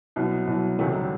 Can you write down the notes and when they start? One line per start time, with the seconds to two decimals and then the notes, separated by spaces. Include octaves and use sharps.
0.16 C2 B2 F#3
0.47 C2 B2 F#3
0.79 C#2 C3 D#3 F#3 A3
0.95 G3